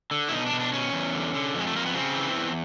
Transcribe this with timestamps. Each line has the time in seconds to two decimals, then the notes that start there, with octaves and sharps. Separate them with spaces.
0.11 D3
0.29 E4
0.32 B2 D#4
0.46 D4
0.53 B2
0.60 D4
0.73 B2 C#4
0.93 E2
1.14 D3
1.34 D3
1.55 F2 G#3
1.67 A3
1.75 F2 A#3
1.86 B3
1.94 C#3 C4
2.15 E3
2.35 E2